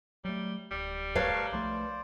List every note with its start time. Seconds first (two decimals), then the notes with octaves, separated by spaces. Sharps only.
0.25 F#3 G3 A3
0.71 D1 G3
1.15 A3 A#4 B4 C#5 F5 A5
1.52 B1 F3 A3 C5 D5